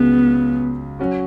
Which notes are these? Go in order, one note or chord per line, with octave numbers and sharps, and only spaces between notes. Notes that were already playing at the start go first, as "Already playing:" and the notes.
Already playing: C#2 C#3 F#3 B3 C#4
F#3 C#4 F#4